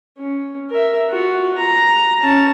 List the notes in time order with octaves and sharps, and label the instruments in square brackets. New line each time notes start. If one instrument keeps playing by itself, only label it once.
[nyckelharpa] C#4
A#4 E5
F4 F#4
A#5
C#4 A5